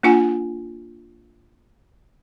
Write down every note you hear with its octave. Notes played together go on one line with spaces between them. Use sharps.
A#3 D4 F4 F#5 G#5